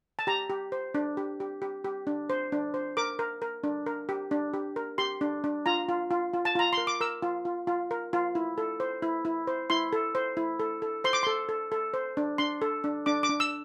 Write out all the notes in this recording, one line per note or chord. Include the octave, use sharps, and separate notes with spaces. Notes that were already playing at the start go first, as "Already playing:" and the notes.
A5
G4 A#5
G4
C5
D4
G4
G4
G4
G4
D4
C5
D4
C5
A#4 D6
A#4
A#4
D4
A#4
G4
D4
G4
A#4
G4 C6
D4
D4
F4 A#5
F4
F4
F4
A5
F4 A#5
A#4 C6
D6
A#4 E6
F4
F4
F4
A#4
F4
E4
A4
C5
E4
E4
C5
E4 C6
A4
C5
E4
A4
A4
C5 C6
D6
A4 C6
A4
A4
C5
D4
D4 C6
A4
D4
D4 D6
D6
D4
E6